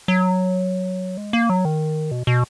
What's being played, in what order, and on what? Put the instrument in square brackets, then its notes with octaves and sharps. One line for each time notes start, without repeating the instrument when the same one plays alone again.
[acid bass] F#3
G#3
A#3
F#3
D#3
B2
B2